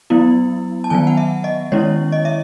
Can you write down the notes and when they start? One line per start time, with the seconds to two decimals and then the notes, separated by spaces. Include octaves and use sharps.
0.10 F#3 B3 E4
0.84 A5
0.90 D#3 F#3 B3 G#5
1.07 F#5
1.17 E5
1.44 D#5
1.72 D#3 G#3 C#4 E4 C#5
2.12 D#5
2.25 E5